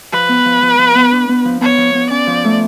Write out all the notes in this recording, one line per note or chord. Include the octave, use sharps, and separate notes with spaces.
F3 B4
B3
F3
F3
F3
B3
D4
B3
F3
B3 C#5
F3
B3
C#4 D5
F3
A3